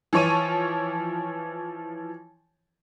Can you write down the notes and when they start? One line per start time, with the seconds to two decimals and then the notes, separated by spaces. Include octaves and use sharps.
0.13 E3 F3 C#5 C#6 D#7